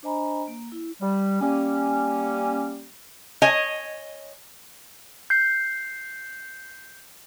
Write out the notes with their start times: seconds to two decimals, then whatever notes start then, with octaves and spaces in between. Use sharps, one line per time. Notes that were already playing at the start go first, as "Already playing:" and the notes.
0.03 D4 C5 D#5 G#5 A#5 B5
0.48 A#3
0.72 E4
1.01 G3
1.40 G3 A#3 C#4
3.42 C#5 D#5 G#5
5.30 G6 C7